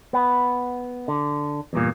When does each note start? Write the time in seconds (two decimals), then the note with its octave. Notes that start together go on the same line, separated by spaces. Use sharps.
0.13 B3
1.08 D3
1.73 E2 G2 A#2